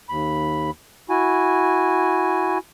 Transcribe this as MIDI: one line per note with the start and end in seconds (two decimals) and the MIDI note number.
0.09 0.70 39
0.09 0.70 83
1.10 2.58 64
1.10 2.58 66
1.10 2.58 80